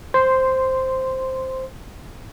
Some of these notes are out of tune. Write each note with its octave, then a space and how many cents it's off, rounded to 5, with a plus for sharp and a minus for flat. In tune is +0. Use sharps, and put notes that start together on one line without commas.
C5 +0 C6 -10